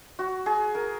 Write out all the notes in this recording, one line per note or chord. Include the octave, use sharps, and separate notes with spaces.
F#4
G#4
A#4